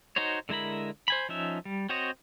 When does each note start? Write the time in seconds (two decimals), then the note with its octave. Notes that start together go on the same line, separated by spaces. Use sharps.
0.16 D#4 F#4 C5 C#5
0.49 D3 G#3 E4 A#4 B5
1.08 C5 G#5 B5
1.29 F3 C#4 D#4 E5
1.65 G3
1.89 C4 F#4 C5 C#5 D#5